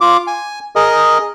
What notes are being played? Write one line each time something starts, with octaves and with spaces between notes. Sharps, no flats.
F4 D6
G#5
G#4 A#4 D#5